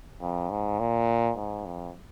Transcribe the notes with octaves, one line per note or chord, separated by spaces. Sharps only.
F2
G#2
A#2
G#2
F2